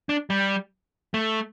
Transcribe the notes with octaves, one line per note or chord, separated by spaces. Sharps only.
D4
G3
A3